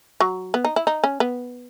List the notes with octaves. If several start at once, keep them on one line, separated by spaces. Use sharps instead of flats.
F#3
B3
D#4
E4
D#4
C#4
B3